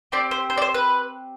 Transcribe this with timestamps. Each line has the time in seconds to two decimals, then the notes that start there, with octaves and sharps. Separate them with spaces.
0.12 C4 G4 D5
0.31 C5
0.50 C5
0.58 D5
0.62 C5
0.74 B4